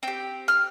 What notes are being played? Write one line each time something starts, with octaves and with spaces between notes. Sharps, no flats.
C4 G4 G5
F6